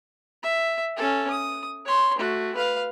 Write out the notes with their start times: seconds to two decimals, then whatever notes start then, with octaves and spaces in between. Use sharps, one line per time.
0.43 E5
0.97 C#4 A4
1.30 D#6
1.86 C#5 C6
2.18 A3 F#4
2.55 B4 F5